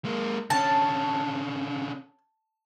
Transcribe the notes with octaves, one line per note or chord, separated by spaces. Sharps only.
G#3 A#3
D3 C#4 A5